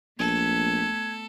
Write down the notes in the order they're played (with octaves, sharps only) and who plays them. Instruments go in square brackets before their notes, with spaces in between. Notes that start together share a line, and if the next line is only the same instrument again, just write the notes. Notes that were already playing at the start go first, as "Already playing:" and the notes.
[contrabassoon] A#1 [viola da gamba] A3 B3 [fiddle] A4 [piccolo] G#6